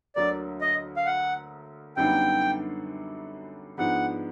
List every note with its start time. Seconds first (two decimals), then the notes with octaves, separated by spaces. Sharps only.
0.16 D2 D3 F#3 A#3 D5
0.61 D#5
0.96 F5
1.06 F#5
1.97 F#2 D3 G3 B3 D#4 G5
3.78 G#2 F3 G#3 B3 D4 F#5